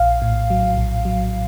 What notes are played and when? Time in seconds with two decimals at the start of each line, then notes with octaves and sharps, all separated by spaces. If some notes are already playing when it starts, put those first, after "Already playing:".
Already playing: A#1 F5
0.22 A2
0.50 F#3
0.77 A#1
1.05 F#3